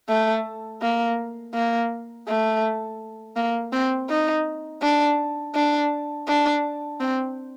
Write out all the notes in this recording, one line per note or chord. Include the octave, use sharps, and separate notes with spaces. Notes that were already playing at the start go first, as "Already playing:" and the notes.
A3
A#3
A#3
A3
A#3
C4
D#4
D4
D4
D4
C4